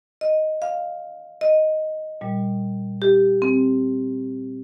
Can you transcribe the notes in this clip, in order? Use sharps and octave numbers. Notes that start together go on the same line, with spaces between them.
D#5
F5
D#5
A#2 G3
G4
C4